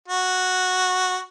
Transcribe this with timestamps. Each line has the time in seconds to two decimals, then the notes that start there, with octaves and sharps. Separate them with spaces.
0.08 F#4